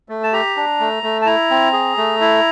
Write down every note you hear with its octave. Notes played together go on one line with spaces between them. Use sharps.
A3
A5
G4 A#5
D4
A3
A3
A5
E4 A#5
C4
G#4
A3
E4